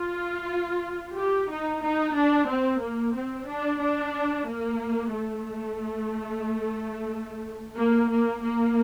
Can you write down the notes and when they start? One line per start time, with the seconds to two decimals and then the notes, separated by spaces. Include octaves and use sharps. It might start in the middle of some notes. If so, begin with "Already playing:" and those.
Already playing: F4
1.17 G4
1.51 D#4
1.82 D#4
2.15 D4
2.49 C4
2.82 A#3
3.16 C4
3.48 D4
3.81 D4
4.48 A#3
5.13 A3
7.77 A#3
8.11 A#3
8.44 A#3